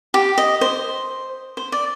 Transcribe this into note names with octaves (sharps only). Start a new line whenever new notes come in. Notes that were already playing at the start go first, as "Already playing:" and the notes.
G4
D#5
C5
C5
D5